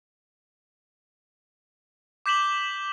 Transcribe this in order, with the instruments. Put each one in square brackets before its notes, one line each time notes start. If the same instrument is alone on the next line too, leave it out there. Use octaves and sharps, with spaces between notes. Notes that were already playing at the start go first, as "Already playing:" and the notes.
[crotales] D6 G6 B6 E7 F#7 G7